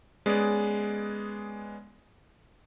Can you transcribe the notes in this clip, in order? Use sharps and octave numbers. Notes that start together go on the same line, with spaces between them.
G#3 B3 C#4 G#4 B4 D5